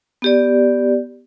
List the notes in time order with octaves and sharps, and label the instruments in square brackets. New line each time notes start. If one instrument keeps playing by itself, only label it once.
[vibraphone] B3 G4 D5